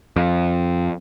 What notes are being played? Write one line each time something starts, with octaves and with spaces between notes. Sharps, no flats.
F2